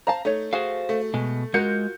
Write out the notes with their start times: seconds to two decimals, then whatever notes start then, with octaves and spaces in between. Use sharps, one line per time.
0.07 C5 F5 A5 A#5
0.25 A3 D#4 C#5
0.53 F#4 G#4 C5 F5
0.89 A3
1.14 B2 G#3
1.54 G#3 F4 F#4 A#4 G6 C#7